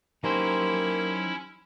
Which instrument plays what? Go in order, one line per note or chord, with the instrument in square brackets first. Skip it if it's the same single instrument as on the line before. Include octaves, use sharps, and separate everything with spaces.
[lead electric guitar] F#3 A#5 [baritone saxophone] A#3 [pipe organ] C#4 E4 [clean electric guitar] D#4 G4 C5